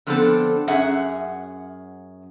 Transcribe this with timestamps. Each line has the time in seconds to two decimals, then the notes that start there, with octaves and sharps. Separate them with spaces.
0.07 D3 F3 B3 C4 D4 A4
0.68 F#2 C#4 G#4 E5 F#5